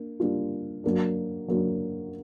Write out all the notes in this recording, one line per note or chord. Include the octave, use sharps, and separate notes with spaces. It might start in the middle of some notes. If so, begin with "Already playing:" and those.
Already playing: A#3 D4
G3 A#3 D4 F4
F#3 A#3 D4
F#3 A#3 D4